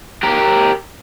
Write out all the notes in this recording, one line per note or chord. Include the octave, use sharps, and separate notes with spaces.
G4 A#4